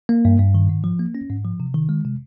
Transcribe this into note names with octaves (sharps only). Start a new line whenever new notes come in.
A#3
G2
G2
D#3
G#2
F3
A#3
C#4
G#2
F3
C3
D#3
G#3
C3